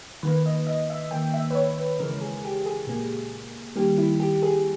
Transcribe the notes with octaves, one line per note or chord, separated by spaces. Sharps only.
D#3 A#3 B4
D#5
D#5
E5
D#3 A#3 G5
E5
B4
C#5
B4
C#3 E3 G#3 A#4
G#4
G4
G#4
A#2 A#3
D#3 G3 A#3 G4
E4
G4
G#4